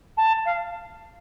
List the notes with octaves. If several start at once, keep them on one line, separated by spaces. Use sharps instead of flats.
A5
F5